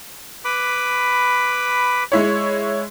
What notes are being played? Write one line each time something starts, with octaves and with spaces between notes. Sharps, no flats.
B4 B5 D6
G#3 E4 C#5